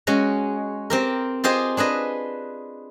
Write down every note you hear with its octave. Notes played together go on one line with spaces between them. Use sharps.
G#3 C#4 F#4
C4 G4 A#4
F4 G4 G#4 C5 D#5
D4 G#4 B4 D#5